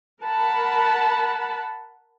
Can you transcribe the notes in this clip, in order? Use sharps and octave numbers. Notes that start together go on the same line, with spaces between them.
A#4 F#5 A5 B5